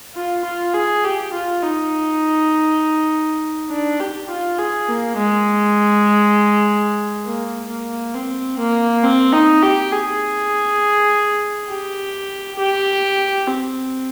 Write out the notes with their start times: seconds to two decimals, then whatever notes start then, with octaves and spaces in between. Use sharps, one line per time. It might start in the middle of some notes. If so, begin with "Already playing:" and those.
0.15 F4
0.45 F4
0.74 G#4
1.04 G4
1.33 F4
1.63 D#4
3.70 D4
4.00 G4
4.30 F4
4.59 G#4
4.89 A#3
5.18 G#3
7.26 A#3
7.69 A#3
8.14 C4
8.59 A#3
9.03 C4
9.33 D#4
9.62 G4
9.92 G#4
11.69 G4
12.59 G4
13.48 C4